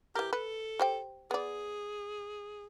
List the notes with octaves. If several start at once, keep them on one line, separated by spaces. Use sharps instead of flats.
E3 G4 A#4
A4 B4
G4 C5 G5
B3 G#4 D5